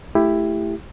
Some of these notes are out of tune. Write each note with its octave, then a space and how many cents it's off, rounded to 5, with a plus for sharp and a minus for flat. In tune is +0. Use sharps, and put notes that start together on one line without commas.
A3 +0 E4 +10 G4 +15